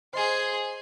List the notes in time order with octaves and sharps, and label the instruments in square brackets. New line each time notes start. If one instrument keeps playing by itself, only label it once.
[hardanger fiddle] G#4 C6 [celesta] C5 D#5 G#5